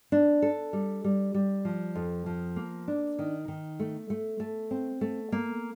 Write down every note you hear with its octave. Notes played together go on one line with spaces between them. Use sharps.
D4
A4
G3
G3
G3
F3
F2
F3
A#3
D4
D#3
D#3
A3
A3
A3
C4
A3
A#3